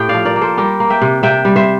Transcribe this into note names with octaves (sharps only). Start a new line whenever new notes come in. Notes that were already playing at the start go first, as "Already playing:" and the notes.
Already playing: A2 G4 G5
D5 F5
F3
A#4 D5
A#3
A4 C5
G3 G4 A#4
A#3
E5 G5
C3
C3 E5 G5
G3
C5 E5